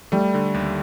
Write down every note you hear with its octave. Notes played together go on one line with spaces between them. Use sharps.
G3 A3
D3
D#2